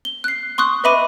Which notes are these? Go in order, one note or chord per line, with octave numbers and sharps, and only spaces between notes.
G7
F#6 C7
C6 C#6 D#6 F#6
B4 D#5 E5 B5 D6 D#7